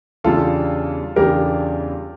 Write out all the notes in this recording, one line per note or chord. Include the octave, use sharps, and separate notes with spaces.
E2 C#3 G3 D4 F4 A4
E2 C#3 G3 D4 G4 A#4